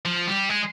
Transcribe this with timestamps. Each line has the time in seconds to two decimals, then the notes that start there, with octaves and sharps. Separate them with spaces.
0.05 F3
0.27 G3
0.49 G#3